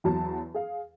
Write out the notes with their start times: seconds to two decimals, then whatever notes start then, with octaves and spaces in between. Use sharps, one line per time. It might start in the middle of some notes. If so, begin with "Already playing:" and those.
0.04 E2 F#3 A5
0.54 G#4 F5